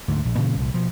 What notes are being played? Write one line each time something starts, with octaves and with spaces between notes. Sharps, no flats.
D2 G#2
A#1
G2 A#2 C#3 E3
C2 A#2
B2 F3